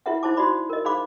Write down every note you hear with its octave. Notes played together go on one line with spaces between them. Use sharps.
E4 F4 G#4 B4 E5 F#5
D#4 E4 C5 A5 D6
D#4 F#4 C5 D5 B5 D6
A#4 D#5
D#4 G#4 C5 F5 B5 D6